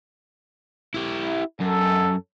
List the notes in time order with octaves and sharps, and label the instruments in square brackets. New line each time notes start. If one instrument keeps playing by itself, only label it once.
[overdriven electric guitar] E4 G4
[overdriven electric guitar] F#2 [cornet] A4